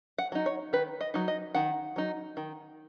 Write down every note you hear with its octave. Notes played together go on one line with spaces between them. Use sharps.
F#5
F#3 D#4
C#5
D#3 B4
D#5
F#3 D#4
D#5
D#3 F#5
F#3 D#4
D#3